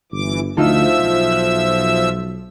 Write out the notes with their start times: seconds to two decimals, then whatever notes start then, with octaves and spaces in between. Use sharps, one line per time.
0.12 G1 E3 D6
0.57 D2 F3 D#4 F4 A4 E5 E6
0.99 B1
1.32 F#6